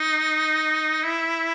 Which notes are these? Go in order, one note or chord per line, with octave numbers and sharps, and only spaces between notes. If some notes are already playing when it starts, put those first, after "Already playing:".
Already playing: D#4
E4